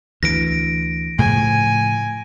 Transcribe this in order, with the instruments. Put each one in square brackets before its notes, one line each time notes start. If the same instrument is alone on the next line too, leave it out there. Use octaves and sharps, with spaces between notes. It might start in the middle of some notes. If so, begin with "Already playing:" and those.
[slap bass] D2 E3 [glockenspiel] A#6 D7
[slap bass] A2 C#3 F3 [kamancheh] G#5